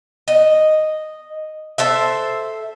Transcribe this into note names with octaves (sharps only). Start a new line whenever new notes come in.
D#5
A4 C5 E5